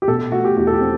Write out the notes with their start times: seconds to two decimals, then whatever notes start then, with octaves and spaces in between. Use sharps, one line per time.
0.02 G4
0.08 B2 A4
0.32 A3 F#4
0.45 G4
0.57 E2 G4
0.67 A4
0.73 G4
0.81 C4